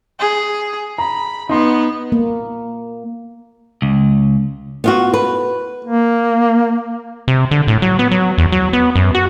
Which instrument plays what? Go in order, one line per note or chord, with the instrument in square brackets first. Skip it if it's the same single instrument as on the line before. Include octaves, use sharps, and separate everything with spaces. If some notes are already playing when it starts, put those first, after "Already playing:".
[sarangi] G#4
[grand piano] A#5 [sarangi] B5
[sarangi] B3 [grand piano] D#4 C6
[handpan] A#3
[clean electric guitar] C#2
[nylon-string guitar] B3 F4 F#4
B4
[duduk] A#3
[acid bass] C3
D3
A2
F#3
B3
F#3
E2
F#3
B3
F#2
F#4